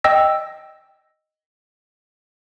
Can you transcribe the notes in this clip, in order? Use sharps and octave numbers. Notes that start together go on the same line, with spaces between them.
D#5 G5 E6 A#6